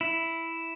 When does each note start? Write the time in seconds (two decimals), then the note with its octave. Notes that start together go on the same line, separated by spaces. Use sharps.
0.01 E4